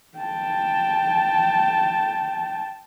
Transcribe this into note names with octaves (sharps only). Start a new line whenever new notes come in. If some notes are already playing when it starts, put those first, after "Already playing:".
G5 A5